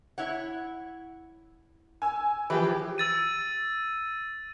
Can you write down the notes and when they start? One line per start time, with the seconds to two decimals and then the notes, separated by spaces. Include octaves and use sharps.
0.18 E4 C#5 F#5
2.02 G#5 E6
2.50 E3 F3 G4 G#4 B4
2.98 E6 A6 D#7